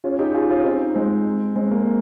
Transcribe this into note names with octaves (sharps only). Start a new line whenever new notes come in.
C#4 F4
D#4 G4
F4 G#4
C#4 F4
C4 D#4
G#3 C4
G#3 C4
A#3